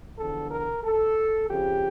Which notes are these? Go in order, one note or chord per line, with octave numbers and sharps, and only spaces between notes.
E2 D3 F3 A4
A#4
A4
F2 C#3 F3 G4